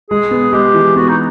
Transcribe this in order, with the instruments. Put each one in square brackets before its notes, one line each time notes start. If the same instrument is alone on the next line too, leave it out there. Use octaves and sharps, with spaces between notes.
[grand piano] G#3 [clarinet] G#4
[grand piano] B3
[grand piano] G#3 [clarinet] G4
[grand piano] E3
[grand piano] B3 [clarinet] F#4
[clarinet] D#4